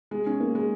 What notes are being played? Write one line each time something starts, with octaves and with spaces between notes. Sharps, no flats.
G#3
C#4
A#3
G#3